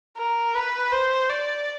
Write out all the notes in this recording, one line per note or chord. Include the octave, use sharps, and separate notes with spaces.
A#4
B4
C5
D5